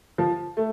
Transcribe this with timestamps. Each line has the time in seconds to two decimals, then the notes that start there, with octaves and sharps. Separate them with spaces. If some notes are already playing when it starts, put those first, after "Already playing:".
0.18 F3
0.57 A3